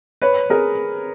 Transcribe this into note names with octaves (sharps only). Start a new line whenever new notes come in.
B4 C#5
G#4 A#4